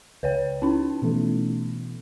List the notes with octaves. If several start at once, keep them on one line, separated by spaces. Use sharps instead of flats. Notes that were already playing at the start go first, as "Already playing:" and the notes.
C#2 B4 C#5 G5
C#4 D#4 E4 A5
B2 E3 A3